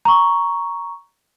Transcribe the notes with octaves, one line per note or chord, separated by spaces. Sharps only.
A#5 C#6